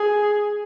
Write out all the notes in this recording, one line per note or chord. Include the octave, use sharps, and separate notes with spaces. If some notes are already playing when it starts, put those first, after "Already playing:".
Already playing: G#4